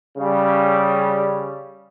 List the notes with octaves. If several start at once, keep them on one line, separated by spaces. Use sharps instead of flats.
C#3 G3